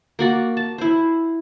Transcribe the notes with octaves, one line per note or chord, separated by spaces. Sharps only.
A#3 F#4 D5
A5
E4 C5